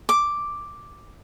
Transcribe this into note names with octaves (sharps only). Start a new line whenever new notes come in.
D6